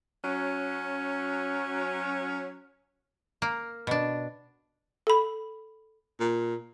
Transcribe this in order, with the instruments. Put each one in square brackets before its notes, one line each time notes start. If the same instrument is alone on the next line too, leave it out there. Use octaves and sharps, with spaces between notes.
[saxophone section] F#3 C#4
[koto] A#3
B2 D4
[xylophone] A4 B5
[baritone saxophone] A#2